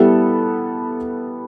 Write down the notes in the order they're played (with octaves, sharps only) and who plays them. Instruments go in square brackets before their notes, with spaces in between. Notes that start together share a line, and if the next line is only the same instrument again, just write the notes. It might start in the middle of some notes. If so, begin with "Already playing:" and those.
Already playing: [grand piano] G3 B3 E4 A4